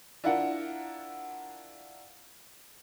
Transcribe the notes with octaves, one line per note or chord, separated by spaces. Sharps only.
D4 E4 F4 A#4 F#5